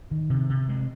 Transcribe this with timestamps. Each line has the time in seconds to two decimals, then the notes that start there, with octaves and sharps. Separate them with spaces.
0.11 D#3
0.30 C3
0.50 C3
0.69 G#3